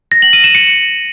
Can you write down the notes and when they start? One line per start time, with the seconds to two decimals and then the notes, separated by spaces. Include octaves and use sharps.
0.12 A#6
0.22 F#7
0.33 D#7
0.44 E7
0.55 C#7